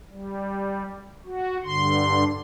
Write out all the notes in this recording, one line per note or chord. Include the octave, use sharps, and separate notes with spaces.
G3
F#4
G2 D3 C6